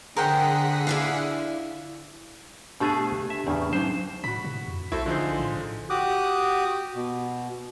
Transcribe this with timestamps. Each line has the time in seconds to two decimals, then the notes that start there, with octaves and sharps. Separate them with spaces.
0.17 D3 G#4 A#4 C5 F#5 G5 B6
0.87 D4 E4 F5
2.80 B2 A3 D4 G4 G#4 A5
3.30 E5
3.47 E2 A2 C#3 D4
3.73 F#3 C#4 D#4 C5
4.24 A2 F#4 B5 B6
4.44 C3
4.66 F2
4.92 A#1 E4 F#4 A4 C5
5.06 D3 F3 D#4 F4 G#4 C5
5.39 A2
5.90 F#4 G4 D6 D#6 F#6
6.95 B2